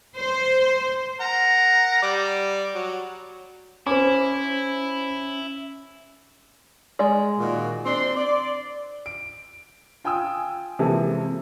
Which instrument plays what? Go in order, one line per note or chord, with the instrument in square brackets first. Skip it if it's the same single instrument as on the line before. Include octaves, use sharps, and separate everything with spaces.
[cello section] C5
[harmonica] A#4 F#5 A#5
G3 D5
F#3
[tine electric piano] C#4 [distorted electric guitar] E4 [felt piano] C5 D6
[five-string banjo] G#3 D5
[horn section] A#2 D#3 F#4
C4 D4 C6
D5
[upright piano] D7
F4 G5 G#5 D#6 E6
C3 E3 F3 G#3 A#3 A4